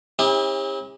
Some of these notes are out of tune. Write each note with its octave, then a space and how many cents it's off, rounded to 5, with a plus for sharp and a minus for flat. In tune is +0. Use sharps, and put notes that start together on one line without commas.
C#4 -40 E4 -35 G4 +40